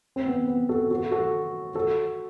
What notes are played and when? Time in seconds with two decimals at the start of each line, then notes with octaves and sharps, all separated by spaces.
0.16 C4
0.26 B3
0.47 B3
0.69 F#4 A4
0.91 F#4 A4
1.12 F#4 A4
1.75 F#4 A4